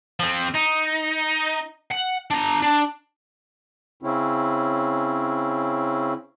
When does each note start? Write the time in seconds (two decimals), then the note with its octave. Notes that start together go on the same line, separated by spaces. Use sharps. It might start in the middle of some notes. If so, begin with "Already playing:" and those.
0.20 F3 C4
0.55 D#4
1.91 F#5
2.31 D4 A#5
2.62 D4
4.03 C#3 C4 C#4 E4